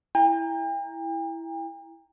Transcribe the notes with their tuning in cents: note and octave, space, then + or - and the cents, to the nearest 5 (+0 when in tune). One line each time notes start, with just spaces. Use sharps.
E4 +0 G5 +40 A#5 +0